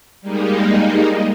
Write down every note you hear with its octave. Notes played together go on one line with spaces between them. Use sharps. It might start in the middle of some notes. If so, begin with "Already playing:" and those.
G3 G#3 A#3 D#4